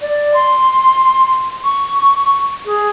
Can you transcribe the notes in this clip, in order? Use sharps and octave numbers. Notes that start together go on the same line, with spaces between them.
D5
C6
C#6
G#4